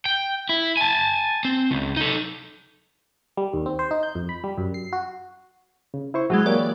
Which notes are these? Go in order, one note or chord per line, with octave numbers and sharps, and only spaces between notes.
G5
E4
G#5 A5
C4
C#2
D#4 A4
G3
D#2
C4
C5
D#4
G6
F2
B5
G3
F#2
C7
F#4
C#3
E4 C5 C#6
E3 F#3 G#3 F#4 G#4
A#3 G4 C#5 D5